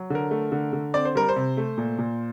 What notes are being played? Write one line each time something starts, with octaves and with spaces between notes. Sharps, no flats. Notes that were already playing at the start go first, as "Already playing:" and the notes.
Already playing: F#3
D3 A#4
A3
D3
D3
C4 D5
C5
G3 A#4
C5
C3
A3
A#2
A#2